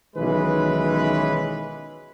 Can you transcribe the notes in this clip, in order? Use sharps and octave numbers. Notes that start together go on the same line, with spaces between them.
B1 D#3 E3 G#3 C#4 B4